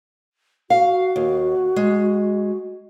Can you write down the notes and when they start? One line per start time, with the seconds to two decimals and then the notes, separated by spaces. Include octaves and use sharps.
0.70 F#4 F5
1.16 D#2
1.76 G#3